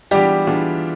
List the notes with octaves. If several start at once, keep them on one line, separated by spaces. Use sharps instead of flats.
E3 G3 G#3 B3 D4 F4 G4
E3 G#3 B3 D4 F4